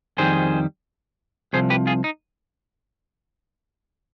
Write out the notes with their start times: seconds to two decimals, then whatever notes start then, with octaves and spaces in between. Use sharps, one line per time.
0.18 F2 D#3 G3 G#4 C5
1.53 C2 C3 F3 G#4 C5
1.70 G4 B4
1.87 F4 G#4
2.04 D#4